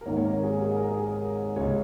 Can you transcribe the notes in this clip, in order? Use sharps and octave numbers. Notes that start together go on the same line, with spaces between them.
A#4
G#1 G#2 D#3 A#3 C#5
C#5
A#4
G#4
G#4
A#4
G#4
C#2 C#3 G#3 C#5